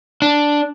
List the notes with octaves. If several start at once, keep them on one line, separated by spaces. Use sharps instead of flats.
D4